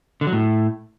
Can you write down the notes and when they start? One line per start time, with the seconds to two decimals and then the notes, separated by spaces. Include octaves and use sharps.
0.21 D3
0.27 F#3
0.33 A2